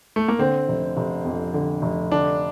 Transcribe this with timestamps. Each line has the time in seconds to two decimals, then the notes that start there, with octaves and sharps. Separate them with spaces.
0.16 A3
0.28 A#3
0.39 D3 C4
0.68 F1
0.97 F1
1.25 F2
1.54 D3
1.82 F1
2.12 D3 D4